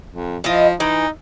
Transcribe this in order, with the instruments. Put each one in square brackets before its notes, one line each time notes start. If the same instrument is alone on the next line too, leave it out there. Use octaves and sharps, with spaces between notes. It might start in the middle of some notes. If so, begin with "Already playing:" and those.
[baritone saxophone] F2
[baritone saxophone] F3 [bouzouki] E4 F4 D#5
[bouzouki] E3 [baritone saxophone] D#4